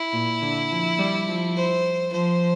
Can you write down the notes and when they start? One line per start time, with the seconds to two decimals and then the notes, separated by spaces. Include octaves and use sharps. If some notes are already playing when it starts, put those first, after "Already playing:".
Already playing: E4
0.13 A#2
0.42 D3
0.70 F3
0.98 G3
1.27 F3
1.56 C5
2.12 F3 C5